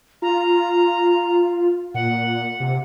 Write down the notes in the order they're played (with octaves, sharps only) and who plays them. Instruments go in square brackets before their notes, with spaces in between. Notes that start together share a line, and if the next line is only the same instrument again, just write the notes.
[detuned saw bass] F4 [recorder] A#5
[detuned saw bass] A#2 [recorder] F#5
[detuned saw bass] C3